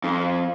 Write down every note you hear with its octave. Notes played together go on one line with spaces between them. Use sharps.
F2